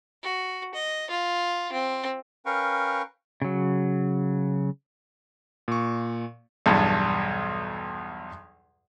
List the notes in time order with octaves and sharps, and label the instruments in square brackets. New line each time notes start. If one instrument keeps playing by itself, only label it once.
[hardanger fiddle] F#4
D#5
F4
C4
[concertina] C#4 A#4 B4 F5 G5 C#6
[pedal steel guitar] C#3 F#3
[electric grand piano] A#2 C#6
[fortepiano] B1 E2 G2